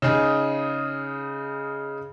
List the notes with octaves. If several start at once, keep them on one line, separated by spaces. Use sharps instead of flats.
C#3 D#4 G#4